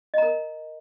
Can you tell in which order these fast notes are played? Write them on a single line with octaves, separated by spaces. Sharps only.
D#5 A#5 A#4